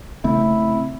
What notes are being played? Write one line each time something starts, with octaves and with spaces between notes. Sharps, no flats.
C#3 A3 C4 E4